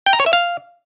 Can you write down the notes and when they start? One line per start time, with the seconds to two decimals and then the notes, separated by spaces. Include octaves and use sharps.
0.06 G5
0.13 A#5
0.20 C#5
0.26 E5
0.33 F5